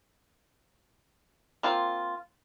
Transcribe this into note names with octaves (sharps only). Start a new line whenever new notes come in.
A#3 C4 F4